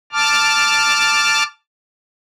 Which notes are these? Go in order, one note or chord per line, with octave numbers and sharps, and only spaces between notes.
A5 D6 F6